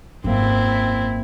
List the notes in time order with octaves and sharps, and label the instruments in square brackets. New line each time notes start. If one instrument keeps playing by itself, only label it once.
[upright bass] G#1 [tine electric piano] F#2 A#3 [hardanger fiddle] C4 E4